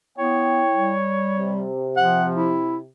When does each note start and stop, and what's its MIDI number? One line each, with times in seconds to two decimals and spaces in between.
0.18 0.63 59
0.18 0.93 64
0.18 1.58 73
0.18 0.93 79
0.72 1.67 55
1.37 2.89 48
1.97 2.57 53
1.97 2.26 78
2.35 2.77 64